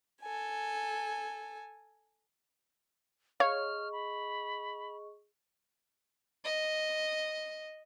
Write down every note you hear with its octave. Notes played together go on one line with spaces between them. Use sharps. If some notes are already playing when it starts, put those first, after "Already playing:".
A4 G#5
G#4 C#5 D#5 F5 C#6 F6
B5
D#5